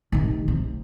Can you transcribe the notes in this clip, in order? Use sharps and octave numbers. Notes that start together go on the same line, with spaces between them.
C3 D#3
C3